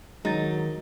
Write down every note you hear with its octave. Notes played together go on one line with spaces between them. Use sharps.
D#3 F#3 G#3 D#4 A6